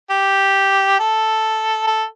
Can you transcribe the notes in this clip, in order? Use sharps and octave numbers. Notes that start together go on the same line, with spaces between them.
G4
A4
A4